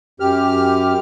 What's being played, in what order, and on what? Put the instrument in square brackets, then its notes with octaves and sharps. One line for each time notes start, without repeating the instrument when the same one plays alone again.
[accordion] F#2 G4 F6